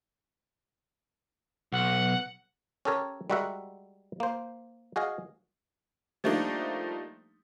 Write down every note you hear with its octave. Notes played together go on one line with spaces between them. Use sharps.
B1 F#5
C#4 G4 A4 A#4 C#5
G3 G#3 F#4 A#4 E5 F#5
A#3 C5
F#4 G#4 D#5 F5
F3 G3 A3 A#3 D4 D#4